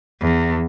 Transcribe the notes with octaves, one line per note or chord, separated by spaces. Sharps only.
E2